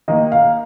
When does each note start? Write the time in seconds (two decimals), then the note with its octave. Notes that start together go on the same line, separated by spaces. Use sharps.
0.08 D#3 A#3 D#5
0.32 F5